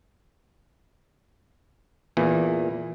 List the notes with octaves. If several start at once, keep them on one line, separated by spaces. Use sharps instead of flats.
E2 A#2 E3